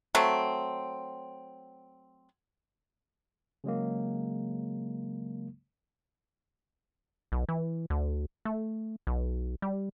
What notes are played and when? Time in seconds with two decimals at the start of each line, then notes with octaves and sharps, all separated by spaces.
0.15 F#3 A3 C4
3.64 C#3 F#3 G#3 A#3
7.32 B1
7.49 E3
7.90 D2
8.45 A3
9.07 B1
9.62 G3